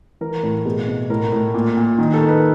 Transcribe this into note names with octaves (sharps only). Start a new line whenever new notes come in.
E3 A#4
A2
B2 G#4
B2
A2 A#4
A2
A#2
A#2
D#3
A4
D#3
B4